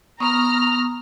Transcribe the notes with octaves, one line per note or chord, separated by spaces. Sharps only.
B3 A#5 C#6 D#6 F6